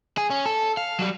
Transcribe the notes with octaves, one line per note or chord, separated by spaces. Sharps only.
G#4
C#4
A4
F5
F#3 G3